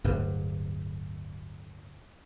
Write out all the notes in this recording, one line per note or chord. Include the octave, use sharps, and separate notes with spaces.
D1 G2